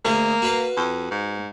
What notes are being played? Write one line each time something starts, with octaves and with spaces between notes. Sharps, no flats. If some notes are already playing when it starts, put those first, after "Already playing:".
D2 A#3 G#4
F#4 B4 F5
F2
G#2